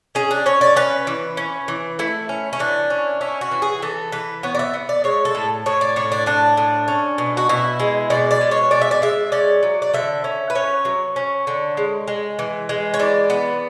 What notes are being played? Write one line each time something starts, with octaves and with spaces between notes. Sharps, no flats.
C#4 G#4
D4
C#4 C#5
D5
C#4 B4
E3
C#4
E3
A3 E4
C#4
C#4
E3 D4
C#4
C#4 E4
F#4
E3
G#4
E3 A4
E3 B4
B3 C#5
D5
E5
B3
D5
G#3 C#5
A4
A2
A2 C#5
D5
A2 C#5
D4
A2 D4
A2
C#4
B2
F#4
B2 E4
G#3
B2 D5
D5
G#3
C#5
B2 D5
E5
D5
G#3 E5
C#4 D5
F#3
D5
D3 E5
C#4
B4
C#4 C#5
F#3
C#4
D3
G#3
G#3
E3
G#3
C#5
E3 D5
B3